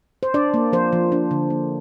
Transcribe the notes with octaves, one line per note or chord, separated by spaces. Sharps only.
C5
D4 D5
A#3
F3 C5
F3
D4
D3
A#3